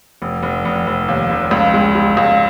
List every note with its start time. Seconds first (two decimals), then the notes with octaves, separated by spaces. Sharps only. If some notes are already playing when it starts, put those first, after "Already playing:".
0.22 F1
0.43 F1
0.65 F1
0.87 F1
1.08 D#2
1.30 F1
1.51 C#2
1.74 G#3
1.95 G#3
2.17 C#2